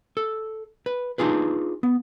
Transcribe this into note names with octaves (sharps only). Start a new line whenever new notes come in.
A4
B4
D4 D#4 F4 G#4 B4
B3